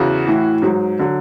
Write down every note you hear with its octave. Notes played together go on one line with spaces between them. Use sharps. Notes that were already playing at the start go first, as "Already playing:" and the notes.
Already playing: E2 C#3 F#4
A2 E3
G#2 F#3
D3 F#3